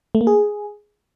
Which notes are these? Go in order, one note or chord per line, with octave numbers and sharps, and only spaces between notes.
A3
A#3
G#4